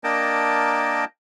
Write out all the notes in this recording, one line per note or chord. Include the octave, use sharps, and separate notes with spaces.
A#3 D4 A#4 D#5 G5 A5